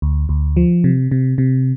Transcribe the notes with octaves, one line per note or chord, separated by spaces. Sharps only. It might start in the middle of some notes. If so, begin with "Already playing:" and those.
D2
D2
F3
C3
C3
C3